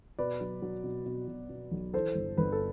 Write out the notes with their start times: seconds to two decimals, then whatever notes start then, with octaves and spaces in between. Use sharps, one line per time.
0.19 B2 B4 D5
0.41 F#3
0.62 F#3
0.84 B2
1.06 B2
1.28 B2
1.49 B2
1.71 B1
1.93 E3 A4 C5
2.15 G1
2.38 G1 B4
2.52 A4